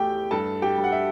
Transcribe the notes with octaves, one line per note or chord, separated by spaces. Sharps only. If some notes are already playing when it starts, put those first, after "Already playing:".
Already playing: E2 A3 G4 G5
G2 A4 A5
G4 G5
G2
F#5
E5